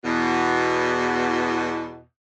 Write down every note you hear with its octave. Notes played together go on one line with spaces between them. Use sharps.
E2 B2